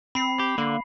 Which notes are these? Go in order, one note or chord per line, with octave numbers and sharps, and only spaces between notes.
C4 B5 C7
G4
D3 A#3